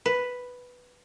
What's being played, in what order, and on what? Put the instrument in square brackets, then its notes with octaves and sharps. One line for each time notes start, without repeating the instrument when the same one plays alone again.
[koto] B4